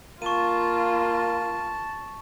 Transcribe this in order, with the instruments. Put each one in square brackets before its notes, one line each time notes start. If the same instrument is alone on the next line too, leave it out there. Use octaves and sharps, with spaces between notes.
[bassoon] A#3 [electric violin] F4 [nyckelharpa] A5 [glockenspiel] C#6 D#7